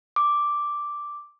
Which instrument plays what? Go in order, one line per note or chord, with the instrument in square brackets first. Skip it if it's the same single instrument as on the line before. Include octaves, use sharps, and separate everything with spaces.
[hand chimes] D6